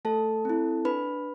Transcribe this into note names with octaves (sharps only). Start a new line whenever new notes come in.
A3 A4 A5
C4 E4
D4 B4 B5